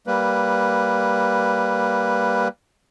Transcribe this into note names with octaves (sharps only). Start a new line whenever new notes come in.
G3 A#3 B4